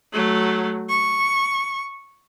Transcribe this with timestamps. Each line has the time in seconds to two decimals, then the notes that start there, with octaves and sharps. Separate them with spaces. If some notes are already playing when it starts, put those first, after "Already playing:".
0.12 F#3 A3
0.89 C#6